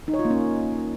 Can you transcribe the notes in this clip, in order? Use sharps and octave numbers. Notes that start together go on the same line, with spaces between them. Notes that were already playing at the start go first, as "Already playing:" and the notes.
D#4
C#5
F4
A#3
C#4